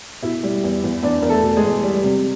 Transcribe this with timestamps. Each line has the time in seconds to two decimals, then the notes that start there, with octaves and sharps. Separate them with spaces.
0.23 B2 E4 E5
0.44 G3
0.64 E2
0.84 E2
1.03 E2 D4 D5
1.22 E2 A#4
1.30 A3 A4
1.43 B2
1.57 G#3 G#4
1.63 E2
1.83 G3
2.03 C3